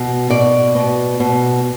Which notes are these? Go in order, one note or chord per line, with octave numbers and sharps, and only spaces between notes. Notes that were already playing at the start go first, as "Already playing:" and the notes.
Already playing: B2
B2 D5
B2
B2